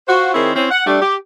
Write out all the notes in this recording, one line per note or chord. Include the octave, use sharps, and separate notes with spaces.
F4 F#4 C5
D#3 C4 E4 G#4 A#4 C#5
C4 C#4 E4
F#5
G3 A3 D4
G4